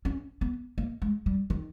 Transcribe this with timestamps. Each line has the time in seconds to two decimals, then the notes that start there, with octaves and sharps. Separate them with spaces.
0.05 C#4
0.41 B3
0.78 A#3
1.02 G#3
1.26 G3
1.50 D#3